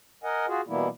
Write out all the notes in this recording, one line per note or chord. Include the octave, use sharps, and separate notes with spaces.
A#4 D#5 F#5 G#5
F4 F#4 G#4
B2 E3 G3 A#3 B3 E4